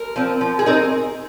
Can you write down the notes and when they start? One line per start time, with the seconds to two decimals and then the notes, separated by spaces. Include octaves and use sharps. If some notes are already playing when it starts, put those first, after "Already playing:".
Already playing: A#4
0.16 F3 C4
0.41 F3
0.59 G#4
0.66 C4 D#4 A#4